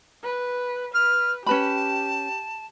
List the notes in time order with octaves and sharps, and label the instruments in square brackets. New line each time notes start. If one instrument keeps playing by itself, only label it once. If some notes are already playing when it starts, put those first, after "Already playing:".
[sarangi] B4
[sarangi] B4 [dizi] F6
[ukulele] C#4 B4 B5 [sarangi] G4 [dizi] A5